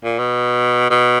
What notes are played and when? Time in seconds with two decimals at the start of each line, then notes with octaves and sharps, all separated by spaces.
0.04 A#2
0.19 B2
0.90 B2